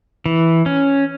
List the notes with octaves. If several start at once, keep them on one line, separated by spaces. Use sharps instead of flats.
E3
C#4